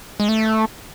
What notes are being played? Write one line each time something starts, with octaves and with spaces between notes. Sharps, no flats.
G#3
A3